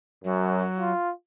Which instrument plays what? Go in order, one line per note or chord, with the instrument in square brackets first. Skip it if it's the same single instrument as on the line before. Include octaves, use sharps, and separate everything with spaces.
[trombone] F#2 [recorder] F#3
[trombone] F4